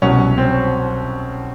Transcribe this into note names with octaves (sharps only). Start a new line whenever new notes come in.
C2 B2 F#3 C#4
C4